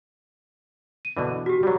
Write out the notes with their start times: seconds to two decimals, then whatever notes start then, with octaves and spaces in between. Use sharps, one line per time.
1.05 D#7
1.17 B2 D3 E3
1.46 F#4 G4
1.63 F#3 G3